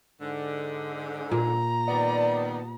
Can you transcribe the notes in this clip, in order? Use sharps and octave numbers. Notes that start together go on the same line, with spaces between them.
G#2 D3
A#2 A#5
D#3 G3 B3 D5